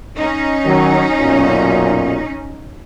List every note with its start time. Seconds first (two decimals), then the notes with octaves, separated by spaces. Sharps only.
0.15 C#4 D#4
0.65 D#3 F#3
1.19 B1 F#2 A#2